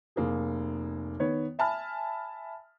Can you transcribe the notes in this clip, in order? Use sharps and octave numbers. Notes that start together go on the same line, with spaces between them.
F1 A#3 G#4
D#3 B3 C#5
E5 G#5 A5 B5 F6